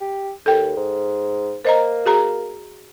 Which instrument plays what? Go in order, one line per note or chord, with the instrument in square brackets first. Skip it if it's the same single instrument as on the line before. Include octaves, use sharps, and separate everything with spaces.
[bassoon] G4
[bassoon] D#2 [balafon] A4 G5
[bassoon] G#2
[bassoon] A#3 [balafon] C5 D#5 A#5
[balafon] F#4 G#4 A#5